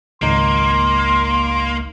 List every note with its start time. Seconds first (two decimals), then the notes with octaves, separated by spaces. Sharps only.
0.22 G#1 C#2 A#3 D#4 C6